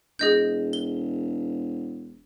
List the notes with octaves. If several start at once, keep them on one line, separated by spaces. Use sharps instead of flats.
E1 G#4 D#5 G6
G7